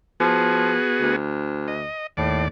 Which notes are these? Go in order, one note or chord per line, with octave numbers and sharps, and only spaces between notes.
F3 B3 F#4 G#4
D2
D#5
D#2 A2 D5